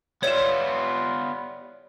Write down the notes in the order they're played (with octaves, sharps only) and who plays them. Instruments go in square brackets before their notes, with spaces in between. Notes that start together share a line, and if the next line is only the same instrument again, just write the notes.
[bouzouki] G3 E4 [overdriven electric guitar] B3 F4 [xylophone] C#5 E7